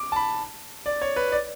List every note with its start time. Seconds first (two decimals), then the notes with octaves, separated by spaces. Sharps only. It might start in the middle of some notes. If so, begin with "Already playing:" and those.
Already playing: D6
0.12 A5
0.16 B5
0.86 D5
1.02 C#5
1.16 B4
1.32 D5